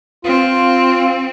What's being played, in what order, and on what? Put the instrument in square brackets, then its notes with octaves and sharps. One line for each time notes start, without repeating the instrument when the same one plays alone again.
[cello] C4 [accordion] F4